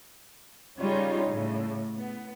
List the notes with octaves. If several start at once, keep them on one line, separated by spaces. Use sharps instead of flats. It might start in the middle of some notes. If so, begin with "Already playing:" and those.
C#3 G3 C#4 D#4 F4
A2 C#3
B3